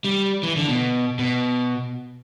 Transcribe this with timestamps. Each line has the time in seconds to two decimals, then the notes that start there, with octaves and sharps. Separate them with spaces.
0.05 G3
0.43 E3
0.57 D3
0.69 B2
1.19 B2